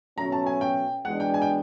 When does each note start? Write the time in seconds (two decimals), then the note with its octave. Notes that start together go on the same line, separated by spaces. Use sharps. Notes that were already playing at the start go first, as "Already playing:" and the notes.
0.17 B2 F#3 A3 C#4 A#5
0.32 A5
0.46 G#5
0.61 G5
1.05 E2 B2 G#3 B3 D4 F#5
1.20 G5
1.34 G#5
1.42 G5